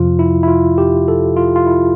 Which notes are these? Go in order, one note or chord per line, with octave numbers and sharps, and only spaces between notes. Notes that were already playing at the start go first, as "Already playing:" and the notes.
Already playing: F2 C3 F3 F4
E4
E4
F4
G4
A4
F4
F4
E4